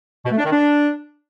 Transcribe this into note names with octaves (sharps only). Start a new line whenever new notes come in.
B2
A3
D4
D#3
D4